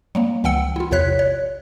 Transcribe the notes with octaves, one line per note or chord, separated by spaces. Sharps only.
F#3 G3 A#3
C#2 E3 F#5 G5 E6 C#7
E4 F4
A#1 E2 C3 C#5 F#6 B6
C#5